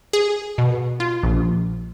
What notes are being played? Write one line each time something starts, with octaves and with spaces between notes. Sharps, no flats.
G#4
B2
F4
A#1